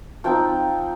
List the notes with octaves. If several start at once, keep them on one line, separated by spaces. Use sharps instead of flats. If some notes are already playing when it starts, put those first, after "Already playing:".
F3 C4 D#4 G5